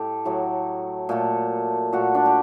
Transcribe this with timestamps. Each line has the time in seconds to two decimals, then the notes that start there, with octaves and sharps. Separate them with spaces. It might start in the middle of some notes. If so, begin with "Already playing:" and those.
Already playing: A2 A3 G4 A4
0.25 A2 F#3 A3
1.09 A#2 A3
1.93 A#2 A3 F#4
2.15 D4
2.25 G4